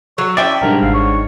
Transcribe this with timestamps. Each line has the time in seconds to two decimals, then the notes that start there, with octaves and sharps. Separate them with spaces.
0.18 F#3 C#5 E6
0.37 C#4 E4 D5 E5 G5 A5 C6 G6
0.61 G#2 B2 D3 G3 D4 A#4
0.82 G#1 F5
0.94 C#5